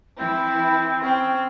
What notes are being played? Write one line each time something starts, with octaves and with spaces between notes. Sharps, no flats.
E3 C4 E4 G5
C4 C#4